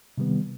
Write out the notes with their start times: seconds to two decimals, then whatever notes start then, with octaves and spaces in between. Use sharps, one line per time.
0.18 C3 D#3 G3 B3